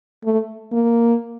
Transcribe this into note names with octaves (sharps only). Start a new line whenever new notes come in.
A3
A#3